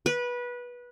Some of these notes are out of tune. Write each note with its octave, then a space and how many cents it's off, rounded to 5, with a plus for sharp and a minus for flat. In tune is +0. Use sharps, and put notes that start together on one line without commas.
B4 -20